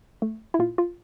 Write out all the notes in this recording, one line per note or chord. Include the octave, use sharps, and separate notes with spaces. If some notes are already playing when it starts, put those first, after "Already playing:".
A3
E4
A#2 F4
F4